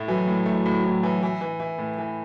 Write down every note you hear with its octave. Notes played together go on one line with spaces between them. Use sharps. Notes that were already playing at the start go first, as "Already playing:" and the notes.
Already playing: A2 A3
E3 F#3
A2
A3
A2
A2
E3
E3
E3
E3
A2
E3